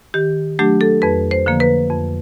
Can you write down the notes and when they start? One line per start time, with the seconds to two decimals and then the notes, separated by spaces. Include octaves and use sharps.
0.14 D#3 G4
0.59 F#3 A3 D4 G4
0.81 A4
1.02 F2 B4
1.31 C5
1.46 D3 F3 A#3
1.60 B4
1.90 F2